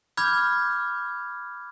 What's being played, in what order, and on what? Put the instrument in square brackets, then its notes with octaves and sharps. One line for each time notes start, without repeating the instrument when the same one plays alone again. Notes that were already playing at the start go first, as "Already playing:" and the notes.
[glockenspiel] B5 D6 F6 G6 G#6